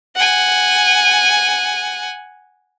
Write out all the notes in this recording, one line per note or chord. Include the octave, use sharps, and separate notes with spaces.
F#5 G#5